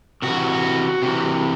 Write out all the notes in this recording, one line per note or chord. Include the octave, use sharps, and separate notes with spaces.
C3 E3 F#4
C3 E3